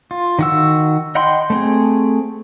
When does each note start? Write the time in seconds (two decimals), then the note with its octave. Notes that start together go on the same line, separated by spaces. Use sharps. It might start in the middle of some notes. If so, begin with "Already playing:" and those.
0.11 F4
0.39 D#3 F#4 E6
1.15 D#5 F#5 G5 B5 C6
1.50 A3 C4 G#4